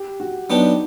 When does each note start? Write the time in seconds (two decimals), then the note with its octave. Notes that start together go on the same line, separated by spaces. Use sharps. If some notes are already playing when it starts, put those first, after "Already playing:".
Already playing: G4
0.20 F#4
0.49 F#3 B3 D4 D#4 G4